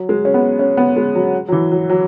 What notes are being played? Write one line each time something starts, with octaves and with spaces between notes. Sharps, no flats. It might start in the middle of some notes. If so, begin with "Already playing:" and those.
Already playing: F#3
G#3
C#4
B3
C#4
B3
G#3
F#3
F#3
E3
F#3
F#3